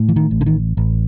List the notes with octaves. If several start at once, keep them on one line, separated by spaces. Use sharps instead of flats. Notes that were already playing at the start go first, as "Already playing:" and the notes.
Already playing: A2
E3
D#3
A1
D3
D#3
A1